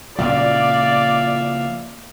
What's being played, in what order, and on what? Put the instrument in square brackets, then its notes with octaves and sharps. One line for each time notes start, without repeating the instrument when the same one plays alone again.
[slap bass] A#2 C#3 F3 [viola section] D5 [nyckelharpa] E5 F5